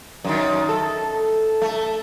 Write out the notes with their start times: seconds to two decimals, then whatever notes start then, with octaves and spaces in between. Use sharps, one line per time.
0.24 F#2 D#3
0.69 A4
1.62 A3